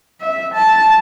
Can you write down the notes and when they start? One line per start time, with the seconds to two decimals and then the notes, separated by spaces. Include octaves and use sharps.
0.21 E5
0.54 A5